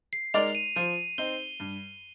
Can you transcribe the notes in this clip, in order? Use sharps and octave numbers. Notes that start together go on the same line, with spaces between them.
C7
G#3 D#4 A#4 D5 F7
D#7
F3 D#7
C4 D#4 G7
G2